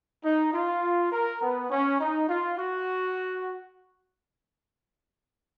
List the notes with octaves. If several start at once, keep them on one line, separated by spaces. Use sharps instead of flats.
D#4
F4
A#4
B3
C#4
D#4
F4
F#4